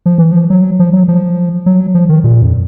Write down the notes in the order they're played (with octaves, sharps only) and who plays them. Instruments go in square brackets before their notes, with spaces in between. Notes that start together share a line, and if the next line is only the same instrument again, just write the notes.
[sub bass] F3
E3
F3
F#3
F3
F#3
F3
F#3
F3
D#3
A#2
F2